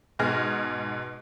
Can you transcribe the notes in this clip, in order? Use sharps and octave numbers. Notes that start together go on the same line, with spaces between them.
G#2 B2 G#4 F6 A#6